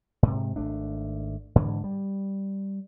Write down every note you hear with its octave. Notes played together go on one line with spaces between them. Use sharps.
G#2 C3
G#1 A3 D4
G#2 D3 E3
G3